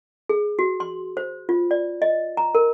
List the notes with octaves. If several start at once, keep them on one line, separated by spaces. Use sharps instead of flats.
G#4
F#4
C6
C5
F4
D5
D#5
A#5
A#4